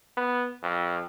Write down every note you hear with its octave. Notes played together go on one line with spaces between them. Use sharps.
B3
F2